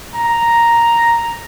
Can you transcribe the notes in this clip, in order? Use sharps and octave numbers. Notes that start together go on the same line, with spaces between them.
A#5